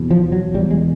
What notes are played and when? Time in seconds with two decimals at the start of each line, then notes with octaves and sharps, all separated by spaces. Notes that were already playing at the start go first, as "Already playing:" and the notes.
Already playing: E2 B2
0.11 F3
0.32 F#3
0.54 E2 B2 G3
0.71 G#3